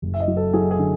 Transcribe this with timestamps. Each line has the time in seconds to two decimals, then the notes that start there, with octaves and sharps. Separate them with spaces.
0.02 F#1
0.14 E5
0.20 D#5
0.28 F#3
0.37 A4
0.53 F#3 G#4
0.71 G#4
0.79 D3